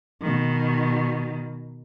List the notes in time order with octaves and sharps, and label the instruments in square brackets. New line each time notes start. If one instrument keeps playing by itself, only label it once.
[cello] B2 D#3